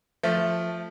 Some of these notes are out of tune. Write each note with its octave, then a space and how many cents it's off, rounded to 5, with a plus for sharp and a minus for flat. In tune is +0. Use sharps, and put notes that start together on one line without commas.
F3 +0 A3 +0